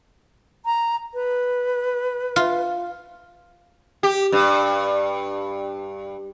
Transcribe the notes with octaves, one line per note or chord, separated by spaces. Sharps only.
A#5
B4
F4
G4
G2